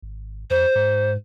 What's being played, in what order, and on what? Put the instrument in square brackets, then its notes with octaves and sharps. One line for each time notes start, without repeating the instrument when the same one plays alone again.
[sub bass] G#1
[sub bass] F2 [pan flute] C5
[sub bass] G#2